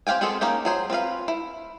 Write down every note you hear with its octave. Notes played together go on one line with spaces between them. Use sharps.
C4 G4 F5 G5 G#5
G#3 B3 C4 G#4 A4
A#3 C#4 D#4 G4
F#3 G#4 C5
C4 F4 B4 F5
E4